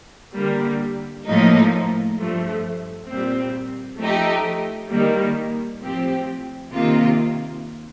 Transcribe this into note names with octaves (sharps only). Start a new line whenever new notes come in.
D3 G3 A#3
A2 F3 A#3 D#4
G2 F3 A3
A#2 G3 C4
F3 A3 D#4 G4
D#3 G3 A#3
A2 F3 C4 G4
C3 D#3 A#3 F4